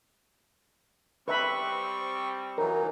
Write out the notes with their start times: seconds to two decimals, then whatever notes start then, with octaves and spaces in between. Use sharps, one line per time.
1.28 G3 C4 B4 E5 B5 C#6
2.58 E3 F#3 D#4 A#4